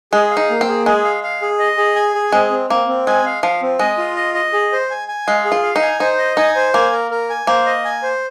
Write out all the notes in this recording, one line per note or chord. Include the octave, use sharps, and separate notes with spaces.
G#3 G#4
F5
D#4
A#3
C4
G#4
G#3 G#4
F5
F5
G#4
D#5
G#4
G#5
G#4
G#3 C4
C4
A#3 C4
C4
G#3 G#5
F5
F3 F5
C4
G#3 D#5
F4
D#5
D#5
G#4
C5
G#5
G#5
G#3 F5
G#4
F4
F5
D#4
G#5
D#4 C5
D#5
D#4 G#5
C5
A#3 G#5
A#4
A#4
G#5
A#3 C5
D#5
G#5
C5